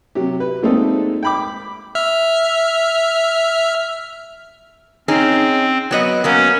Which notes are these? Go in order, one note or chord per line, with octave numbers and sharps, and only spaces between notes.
C3 F#3 G4
B4
A#2 G#3 A3 C4 D#4 A4
G5 B5 D6
E5 F6
C4 C#4 D#4 G#4
F#3 B3 D#5
F#3 A#3 B3 C#4